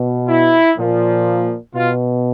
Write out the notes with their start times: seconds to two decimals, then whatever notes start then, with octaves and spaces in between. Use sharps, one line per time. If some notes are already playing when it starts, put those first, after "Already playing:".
Already playing: B2
0.29 E4
0.77 A#2 F3
1.75 B2 F4